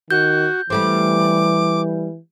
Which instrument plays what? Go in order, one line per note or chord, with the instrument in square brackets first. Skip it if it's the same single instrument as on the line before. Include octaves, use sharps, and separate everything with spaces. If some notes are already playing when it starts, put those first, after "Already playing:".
[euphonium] D#3 [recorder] F#4 [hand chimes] G6
[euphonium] E3 [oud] G3 A3 C4 [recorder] D6